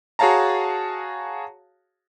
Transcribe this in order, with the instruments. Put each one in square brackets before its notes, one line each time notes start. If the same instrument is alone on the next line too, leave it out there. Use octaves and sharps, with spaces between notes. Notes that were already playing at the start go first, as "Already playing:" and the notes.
[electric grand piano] F#4 G#4 C#5 F5 A5 A#5